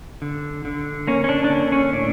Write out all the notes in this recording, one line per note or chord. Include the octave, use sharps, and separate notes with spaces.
D3
D3
A#3 C#4
C#4
D4
D4
D3 C#4
C#4
A2 D4